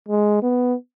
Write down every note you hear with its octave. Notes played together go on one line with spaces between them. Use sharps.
G#3
B3